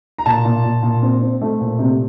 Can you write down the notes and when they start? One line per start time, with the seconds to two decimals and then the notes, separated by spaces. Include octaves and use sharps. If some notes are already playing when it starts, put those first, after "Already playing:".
0.18 A#5
0.26 A#2 A5
0.45 A#2
0.64 A#2
0.83 A#2
1.02 C4
1.21 C4
1.41 A3
1.61 A#2
1.79 C3